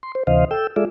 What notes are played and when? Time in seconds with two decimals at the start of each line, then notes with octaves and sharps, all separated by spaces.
0.03 C6
0.15 C5
0.27 D2 C3 E3 C5 D#5 F5
0.51 A4 G5 E6
0.76 G#3 F4 G#4 A4 D5 E5